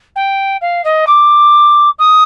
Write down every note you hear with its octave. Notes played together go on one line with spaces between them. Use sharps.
G5
F5
D#5
D6
D#6